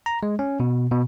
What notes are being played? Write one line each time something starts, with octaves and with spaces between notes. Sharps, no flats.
A#5
G#3
C#4
B2
B2